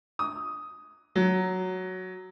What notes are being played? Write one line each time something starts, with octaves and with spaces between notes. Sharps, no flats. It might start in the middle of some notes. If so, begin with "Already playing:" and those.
D#6
F#3